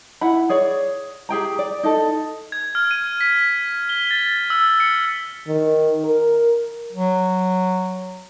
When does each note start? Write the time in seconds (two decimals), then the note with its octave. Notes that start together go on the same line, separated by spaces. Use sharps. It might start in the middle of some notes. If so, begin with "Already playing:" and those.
0.21 E4 F#5 B5
0.50 G#4 C#5 D5
1.29 G4 G#4 G5 A#5
1.59 D5
1.83 D#4 A4
2.52 G#6
2.75 F6
2.91 D#7
3.21 B6
3.89 G7
4.11 A6
4.50 E6
4.80 C#7
5.48 D#3
6.04 A#4
6.93 F#3